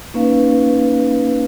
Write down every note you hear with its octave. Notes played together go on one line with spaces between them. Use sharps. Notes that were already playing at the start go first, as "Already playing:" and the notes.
A#3 C#4 D#4 B4 F5